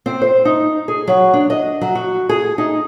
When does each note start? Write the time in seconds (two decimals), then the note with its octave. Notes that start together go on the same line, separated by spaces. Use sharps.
0.06 C4
0.22 C5
0.45 D#4
0.88 G#4
1.07 F#3
1.34 D4
1.50 D#5
1.81 F#3
1.95 F#4
2.29 G#4
2.58 D#4